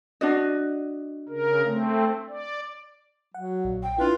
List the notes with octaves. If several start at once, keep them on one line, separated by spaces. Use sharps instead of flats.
D4 F#4 D#5
C#3 A#4
A3 C4
D5
F#3 F#5
A#1
G5
D4 E4 F4 B4